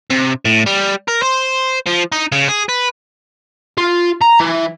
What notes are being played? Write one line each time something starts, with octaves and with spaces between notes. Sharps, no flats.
C3
A2
G3
A#4
C5
F3
D#4
C#3
G#4
B4
F4
A#5
E3